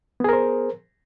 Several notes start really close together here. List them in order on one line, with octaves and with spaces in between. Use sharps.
B3 G#4 A#4 C5